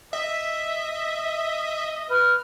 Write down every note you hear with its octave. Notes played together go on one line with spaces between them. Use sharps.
D#5 E5
B4 F6